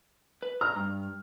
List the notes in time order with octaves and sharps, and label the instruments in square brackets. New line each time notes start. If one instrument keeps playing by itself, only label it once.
[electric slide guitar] B4
[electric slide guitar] A#5 [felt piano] F6
[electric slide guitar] G2